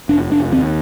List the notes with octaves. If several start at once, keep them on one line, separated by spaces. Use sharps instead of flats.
F1 D4
F1 D4
D#2 C4